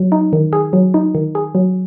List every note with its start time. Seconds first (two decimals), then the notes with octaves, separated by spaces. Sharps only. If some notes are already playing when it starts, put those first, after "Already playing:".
Already playing: F#3
0.12 D#4
0.33 D#3
0.53 G#4
0.73 F#3
0.94 D#4
1.15 D#3
1.35 G#4
1.55 F#3